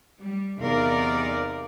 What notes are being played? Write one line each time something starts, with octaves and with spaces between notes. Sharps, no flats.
G3
E2 C3 D#4 A#4 D5 F5